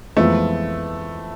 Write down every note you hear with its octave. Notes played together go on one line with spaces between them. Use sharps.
F2 E3 G#3 A3 B3 F4